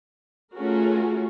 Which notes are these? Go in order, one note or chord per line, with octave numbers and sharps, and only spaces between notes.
A3 C#4 F4 F#4 G#4 A#4